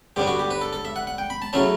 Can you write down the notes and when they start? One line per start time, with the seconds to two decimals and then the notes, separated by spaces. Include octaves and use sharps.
0.16 G2 D3 G3 B3 D4 G4
0.27 F#4
0.39 G4
0.51 B4
0.61 A4
0.73 A4
0.85 E5
0.96 F#5
1.07 F#5
1.18 G5
1.30 B5
1.42 A5
1.53 C#3 F#3 A3 C#4 E4 A5